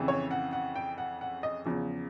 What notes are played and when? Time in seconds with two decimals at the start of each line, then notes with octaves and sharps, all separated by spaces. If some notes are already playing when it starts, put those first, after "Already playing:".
Already playing: F2 C#3 E3
0.08 C#5
0.31 F#5
0.53 F#5
0.76 G5
0.98 F#5
1.21 F#5
1.43 D#5
1.65 E2 C#3 F3